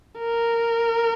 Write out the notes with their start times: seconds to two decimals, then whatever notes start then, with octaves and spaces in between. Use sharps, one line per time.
0.19 A#4